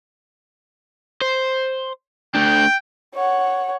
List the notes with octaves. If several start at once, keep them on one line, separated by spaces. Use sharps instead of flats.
C5
A3 D4 G5
C#5 F#5